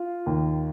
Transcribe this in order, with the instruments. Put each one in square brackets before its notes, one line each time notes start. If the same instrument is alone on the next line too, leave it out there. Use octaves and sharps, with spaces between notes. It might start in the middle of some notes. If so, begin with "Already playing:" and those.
Already playing: [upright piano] F4 F5
D#2 D#3